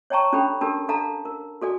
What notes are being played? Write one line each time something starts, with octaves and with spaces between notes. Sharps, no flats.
C#5 D5 G5 A5 A#5 C#6
C#4 D4 G4 A4 G5 B5
D4 G4 A4 A#4 A5
D4 A4 F5 A5 A#5
A#4
F#4 A4 D5 G#5